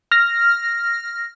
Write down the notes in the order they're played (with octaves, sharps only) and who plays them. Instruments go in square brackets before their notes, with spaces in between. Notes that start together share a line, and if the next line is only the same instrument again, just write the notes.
[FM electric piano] F6 A#6